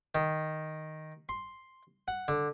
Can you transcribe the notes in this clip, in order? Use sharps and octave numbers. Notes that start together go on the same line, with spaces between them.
D#3
C6
F#5
D3